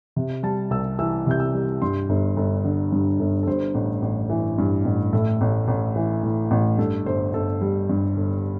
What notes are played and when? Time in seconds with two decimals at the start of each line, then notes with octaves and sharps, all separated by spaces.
0.16 C3
0.43 G3 A5
0.71 C2 E6
0.99 E3 E6
1.27 C3 G6
1.40 E6
1.54 G3
1.82 G2 C6
2.09 G1
2.37 G1
2.64 D3
2.92 G2
3.19 G1
3.43 A4
3.47 G2 C5
3.75 A1
4.02 A1
4.30 E3
4.58 G2
4.85 A1
5.13 A2 A4
5.41 A1
5.68 A1
5.96 E3
6.23 A2
6.51 A1
6.78 G2 A4
7.06 G1 C5
7.33 G1 A4
7.61 G3
7.89 G2
8.16 G1